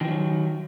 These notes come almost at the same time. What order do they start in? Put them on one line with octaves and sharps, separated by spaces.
D#3 E3 F#3